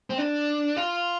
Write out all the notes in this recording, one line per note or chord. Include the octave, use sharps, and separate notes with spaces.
C4
D4
F4